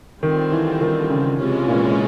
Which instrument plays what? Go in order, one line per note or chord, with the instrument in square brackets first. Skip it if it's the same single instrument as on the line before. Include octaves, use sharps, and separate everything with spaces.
[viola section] D3 G3 C4 F4 [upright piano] D#3
[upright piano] E3
D#3
C#3
[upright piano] C3 [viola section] E3 G#3 C#4 F4
[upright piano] A#2